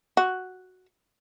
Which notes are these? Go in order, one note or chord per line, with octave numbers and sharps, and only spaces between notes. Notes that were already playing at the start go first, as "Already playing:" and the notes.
F#4